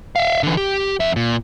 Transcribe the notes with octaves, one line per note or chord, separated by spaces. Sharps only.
E5 F5
D3 E3
G4
F2 E5
A#2